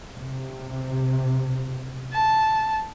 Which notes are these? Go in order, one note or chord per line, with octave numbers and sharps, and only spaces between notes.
C3
A5